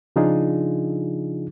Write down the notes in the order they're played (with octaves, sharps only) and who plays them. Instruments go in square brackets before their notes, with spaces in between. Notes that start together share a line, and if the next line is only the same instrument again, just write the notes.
[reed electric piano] C#3 F3 D4 D#4 F4 G#4